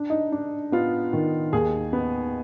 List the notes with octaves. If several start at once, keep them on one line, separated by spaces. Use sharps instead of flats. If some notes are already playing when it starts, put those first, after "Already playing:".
Already playing: D4
D#4
D4
B3 F4
D#3
D#2 G#4
B3